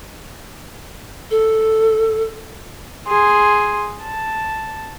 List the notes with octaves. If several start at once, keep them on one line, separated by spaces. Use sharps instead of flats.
A4
G#4 C6
A5